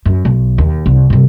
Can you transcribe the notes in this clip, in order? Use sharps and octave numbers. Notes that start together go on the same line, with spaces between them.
F#2
B1
D#2
C2
G2 C3